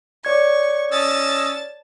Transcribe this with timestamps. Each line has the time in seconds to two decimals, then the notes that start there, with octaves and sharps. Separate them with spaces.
0.25 C#5 D5 C#6 G#6
0.92 C#4 D#5 A5 E6 A6